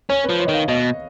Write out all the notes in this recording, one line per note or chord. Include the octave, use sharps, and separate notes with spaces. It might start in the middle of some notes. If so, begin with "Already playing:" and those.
C#4 C#5
B4
F3
C#5
D#3 D#5
F5
B2 D#5